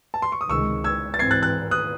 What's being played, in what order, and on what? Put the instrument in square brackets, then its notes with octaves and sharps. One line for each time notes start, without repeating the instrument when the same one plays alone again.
[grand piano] A5
C6
C#6
D#6
[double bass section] C#2 C3 D#3 G#3 [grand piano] C#6 E6
[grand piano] E6 G#6
A6
[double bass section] G#2 E3 C4 [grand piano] G#6 C7
[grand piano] F#6 A6
F#6 A6
D#6 F#6